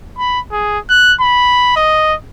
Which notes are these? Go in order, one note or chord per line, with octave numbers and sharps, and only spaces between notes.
B5
G#4
F#6
B5
D#5